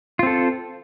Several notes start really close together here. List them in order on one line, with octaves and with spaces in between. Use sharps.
F4 C4 A4